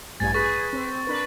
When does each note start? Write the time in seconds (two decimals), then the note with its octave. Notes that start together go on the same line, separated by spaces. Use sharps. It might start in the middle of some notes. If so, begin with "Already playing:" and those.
0.20 A1 G2 G#5 A6
0.34 G#4 B4 C#6 A6
0.73 C4
1.07 D4 A#4 B4